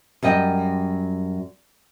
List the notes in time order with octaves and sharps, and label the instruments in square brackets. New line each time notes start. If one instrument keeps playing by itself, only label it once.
[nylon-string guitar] F#2 G3 D#5 G5